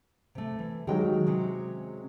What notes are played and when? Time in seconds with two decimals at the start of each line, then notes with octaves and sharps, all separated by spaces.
0.35 C3 A3
0.59 E3
0.87 D#3 F#3 G#3 G4 A#4 G5
1.27 C3 C#4 G#4